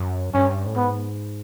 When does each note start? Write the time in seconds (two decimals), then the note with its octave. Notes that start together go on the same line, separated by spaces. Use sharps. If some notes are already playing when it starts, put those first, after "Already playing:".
Already playing: F#2
0.34 G2 C#4
0.66 A2
0.76 G#2 B3